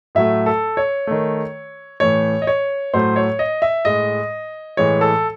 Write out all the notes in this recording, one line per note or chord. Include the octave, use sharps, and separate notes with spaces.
A2 F#3 A3 E5
A4
C#5
D#3 A3
A2 E3 A3 C#5
D#5
C#5
A2 F#3 A3 C5
C#5
D#5
E5
A2 G#3 D#5
A2 E3 G#3 C#5
A4